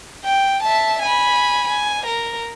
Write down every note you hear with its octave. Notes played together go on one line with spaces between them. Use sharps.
G5
E5 A5
G#5 B5
G#5
A#4